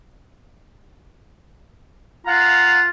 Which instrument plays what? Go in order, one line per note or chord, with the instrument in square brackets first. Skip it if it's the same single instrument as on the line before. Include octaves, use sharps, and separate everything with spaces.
[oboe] F4 [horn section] F5 F#5 A#5